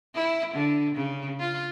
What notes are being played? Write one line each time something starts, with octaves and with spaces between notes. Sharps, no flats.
E4
D3
C#3
F4